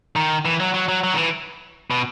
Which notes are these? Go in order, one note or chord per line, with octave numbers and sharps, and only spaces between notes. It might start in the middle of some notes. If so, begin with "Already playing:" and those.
D#3
E3
F#3
F#3
F#3
F#3
D#3
E3
B2